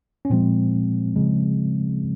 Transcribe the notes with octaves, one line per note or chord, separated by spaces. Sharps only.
C#4
A#2 F3 G#3 C4
C#3 F3 G#3